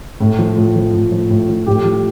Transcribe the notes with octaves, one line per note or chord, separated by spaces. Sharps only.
A2
F3
A2
F3
A2
F3
A2
F3
A2 G4
F3